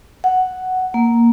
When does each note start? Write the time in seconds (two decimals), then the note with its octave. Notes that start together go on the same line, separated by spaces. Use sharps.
0.24 F#5
0.94 A#3